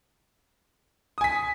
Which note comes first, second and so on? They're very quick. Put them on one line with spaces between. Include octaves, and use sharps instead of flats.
D#6 G#5 B6